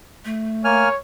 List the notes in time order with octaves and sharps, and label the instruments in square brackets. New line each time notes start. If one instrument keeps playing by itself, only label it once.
[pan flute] A3
[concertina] A#3 G#5 F6 [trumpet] C#5